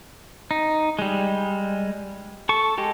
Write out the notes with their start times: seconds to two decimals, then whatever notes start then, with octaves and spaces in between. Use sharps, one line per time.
0.51 D#4
0.99 G3 G#3
2.49 A4 C#6
2.78 G#3 G4 A4